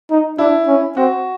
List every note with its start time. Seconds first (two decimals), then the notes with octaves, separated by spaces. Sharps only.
0.10 D#4
0.38 D4 E4
0.67 C#4
0.97 C4 F#4